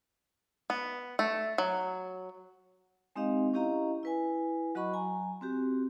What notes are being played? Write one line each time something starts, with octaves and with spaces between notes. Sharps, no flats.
B3
A3
F#3
G#3 C4 D#4 G4 D#5 F5
C#4 E4 G4 D#5 F5 A#5
E4 B4 G#5
F#3 F#4 D#5 F#5 B5 C#6
F#3 G#5 A#5
C4 F#4 G4